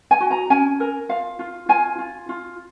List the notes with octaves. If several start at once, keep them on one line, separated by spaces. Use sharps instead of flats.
G#5
F#4
A#5
C#4 G#5
A#4
F4 F5
F4
F4 G#5
F4
F4